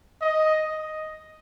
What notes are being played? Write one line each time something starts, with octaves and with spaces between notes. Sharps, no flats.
D#5